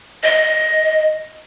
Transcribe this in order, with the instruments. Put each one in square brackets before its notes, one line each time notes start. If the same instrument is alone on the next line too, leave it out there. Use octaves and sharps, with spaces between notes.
[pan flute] D#5